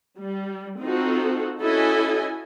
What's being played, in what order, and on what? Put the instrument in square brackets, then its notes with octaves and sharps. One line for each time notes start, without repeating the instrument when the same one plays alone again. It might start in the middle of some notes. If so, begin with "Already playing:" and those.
[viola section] G3
C4 D#4 F4 F#4 A4
C#4 E4 F#4 A4 D#5 G#5